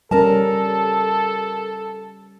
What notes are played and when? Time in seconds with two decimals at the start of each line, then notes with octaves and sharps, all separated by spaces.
0.11 G3 C#4 A4 A#4 A5